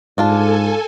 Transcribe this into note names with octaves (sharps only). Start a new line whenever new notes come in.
G#2 D4 F4 A4 G#5 A5